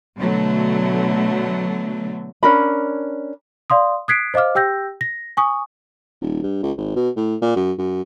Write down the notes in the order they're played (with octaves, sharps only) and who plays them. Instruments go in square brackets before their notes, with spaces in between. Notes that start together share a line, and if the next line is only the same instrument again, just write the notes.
[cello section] B2 D3 F#3 A3
[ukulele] C#4 D4 A#4 B5
[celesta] D5 F5 C6 D#6
D#6 F#6 G#6 B6 C7 D7
C5 D#5 F5 D6 F6
G4 G5 E6 G6 A#6
A#6
G#5 C#6 D#6
[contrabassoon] D#1
G2
C#2
G#1
B2
A2
A#2
F#2
F#2